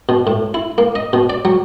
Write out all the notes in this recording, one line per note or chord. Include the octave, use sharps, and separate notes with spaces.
B2
A2
E4
A#3
D#5
B2
D5
F#3